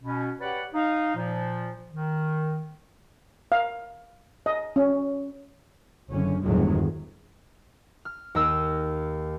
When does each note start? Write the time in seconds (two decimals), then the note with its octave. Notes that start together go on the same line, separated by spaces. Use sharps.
0.03 B2 C#4
0.40 G4 B4 C#5 D5 F#5
0.74 D#4 F5
1.15 A#2 F3
1.91 D#3
3.52 F5
4.46 D#5
4.76 C#4
6.10 F#1 F#2 D3 C#4
6.43 G1 E2 A2 D#3 F#3 G#3
8.05 F6
8.35 D#2 A#4 D#5 E6